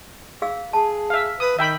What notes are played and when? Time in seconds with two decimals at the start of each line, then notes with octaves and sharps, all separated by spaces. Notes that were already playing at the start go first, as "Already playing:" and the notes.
0.42 G#4 F5 E6
0.73 G#4 A5
1.10 E5 F5
1.40 B4 D#6
1.59 D#3 E5 G5 B5